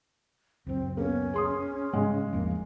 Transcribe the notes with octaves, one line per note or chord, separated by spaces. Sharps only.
C#2 F#2 C4
A#3 B3 C#4
G#4 C6 D#6
G#2 C#3 G3 G#3
G#1 E2 F3 A#3